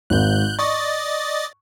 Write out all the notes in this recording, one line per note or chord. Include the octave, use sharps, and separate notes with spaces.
G#1 G#2 F#6 G6
D5 D#5 C#6 A6